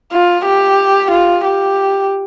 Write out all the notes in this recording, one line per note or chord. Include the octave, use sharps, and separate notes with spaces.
F4
G4
F4
G4